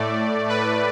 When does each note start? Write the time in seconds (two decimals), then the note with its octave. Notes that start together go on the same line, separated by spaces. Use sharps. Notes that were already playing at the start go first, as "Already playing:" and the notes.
Already playing: A2 A3 D5
0.49 B4